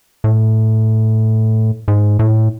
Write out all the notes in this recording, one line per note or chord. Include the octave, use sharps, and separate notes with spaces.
A2
G#2
A2